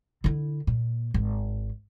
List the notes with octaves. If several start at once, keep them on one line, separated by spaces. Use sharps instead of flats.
D3 E4
A#2
G#1